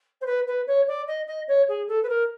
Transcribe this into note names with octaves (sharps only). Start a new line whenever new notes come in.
C5
B4
B4
C#5
D5
D#5
D#5
C#5
G#4
A4
B4
A#4